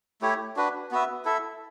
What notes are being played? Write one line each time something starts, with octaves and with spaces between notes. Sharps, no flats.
A3 E4 G4 C#5
D4 F#4 B4
B3 F#4 B4 E5
E4 A4 E5